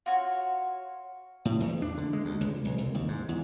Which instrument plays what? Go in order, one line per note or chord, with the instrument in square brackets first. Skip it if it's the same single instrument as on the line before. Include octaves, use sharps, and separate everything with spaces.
[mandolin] F4 F#4 C#5
[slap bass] A2
E2
D4
D3
G#3
D2
C#2
B1
C2
D#2
G#2
E2